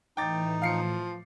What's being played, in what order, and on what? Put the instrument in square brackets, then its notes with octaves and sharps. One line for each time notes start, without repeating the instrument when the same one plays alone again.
[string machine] A2 E3 [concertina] D#4 [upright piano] G5 D6 A6
[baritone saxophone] F3 [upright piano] F5 C7 C#7